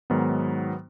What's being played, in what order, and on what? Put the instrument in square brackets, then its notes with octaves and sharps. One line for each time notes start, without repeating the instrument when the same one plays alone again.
[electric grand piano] G#2 D#3 F#3 B3